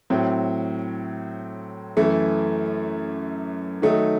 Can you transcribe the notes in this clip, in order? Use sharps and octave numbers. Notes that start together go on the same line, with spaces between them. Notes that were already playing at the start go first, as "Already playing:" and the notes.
A2 F#3 C4
F#2 E3 A3
D#3 F#3 A3 D#4